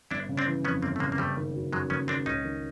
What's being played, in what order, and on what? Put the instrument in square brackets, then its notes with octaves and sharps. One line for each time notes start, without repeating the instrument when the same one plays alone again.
[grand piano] G1 [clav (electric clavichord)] D4 E4
[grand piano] C#3
[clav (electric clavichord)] C4 D4
[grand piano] E3
[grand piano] F2 [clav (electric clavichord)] B3 C#4
[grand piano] G1 [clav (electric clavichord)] A#3 C4
[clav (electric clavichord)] A3
[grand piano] C#3 [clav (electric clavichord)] G#3 A#3
[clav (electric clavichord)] A#3
[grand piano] F#1 [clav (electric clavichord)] G3 A3
[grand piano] D#3
F#3
[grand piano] F#2 [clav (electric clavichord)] F#3 G#3
[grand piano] F#1 [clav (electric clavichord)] B3 C#4
[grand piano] D#3 [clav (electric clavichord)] C4 D4
[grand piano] C#2 [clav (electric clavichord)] C#4 D#4
[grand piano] D#3